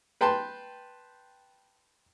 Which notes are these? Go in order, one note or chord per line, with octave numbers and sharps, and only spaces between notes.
B4 G5 A5 C6